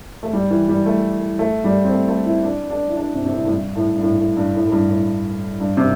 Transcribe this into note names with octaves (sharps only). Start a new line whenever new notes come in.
A3
G3
E3
G3
A3
A3
G3
C4
A3
A3
E4
D4
D4
E4
D4
C3
C3
A2
A2
G2
A2
G2
A2
A2
G2
A2
A2
G2
A2
G2
C3